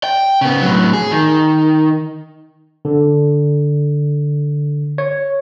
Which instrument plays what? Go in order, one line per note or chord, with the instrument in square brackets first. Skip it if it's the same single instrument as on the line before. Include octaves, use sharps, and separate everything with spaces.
[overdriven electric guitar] G5
C#3 B3
A2 F#3
G#4
D#3
[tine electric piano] D3
C#5